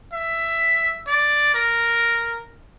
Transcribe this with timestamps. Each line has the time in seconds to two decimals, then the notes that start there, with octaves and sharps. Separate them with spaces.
0.13 E5
1.07 D5
1.55 A#4